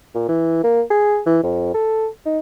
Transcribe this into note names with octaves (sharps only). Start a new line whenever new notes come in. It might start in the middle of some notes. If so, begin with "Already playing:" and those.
A#2
E3
A#3
G#4
E3
F2
A4
D#4